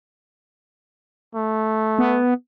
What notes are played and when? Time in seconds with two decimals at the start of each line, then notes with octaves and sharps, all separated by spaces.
1.35 A3
1.99 B3